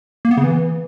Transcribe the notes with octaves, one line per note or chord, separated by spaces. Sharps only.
A#3
B3
C#3
E3